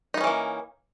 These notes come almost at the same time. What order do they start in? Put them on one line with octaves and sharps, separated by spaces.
D#4 B3 C#4 E3 A#3